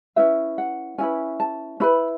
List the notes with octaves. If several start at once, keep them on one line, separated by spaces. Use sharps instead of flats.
C#4 E4 B4 E5
F#5
C#4 E4 B4 G#5
A5
C#4 E4 B4 B5